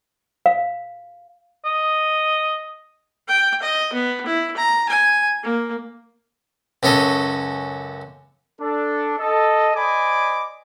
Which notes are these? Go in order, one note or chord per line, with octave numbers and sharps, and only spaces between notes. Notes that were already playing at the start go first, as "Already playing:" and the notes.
F5
D#5
G5
D#5
B3
E4
A#5
G#5
A#3
C#2 F#2 C#4 A4 D#5
D4 A4
A4 D#5
C5 D5 D#5 G#5 B5 D6